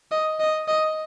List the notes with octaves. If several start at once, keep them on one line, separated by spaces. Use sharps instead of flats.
D#5
D#5
D#5